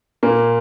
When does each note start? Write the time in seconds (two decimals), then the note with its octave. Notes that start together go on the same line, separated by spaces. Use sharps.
0.23 A#2 A#3